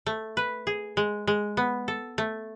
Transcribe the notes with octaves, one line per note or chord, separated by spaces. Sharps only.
A3
B4
G#4
G#3
G#3
B3
A4
A3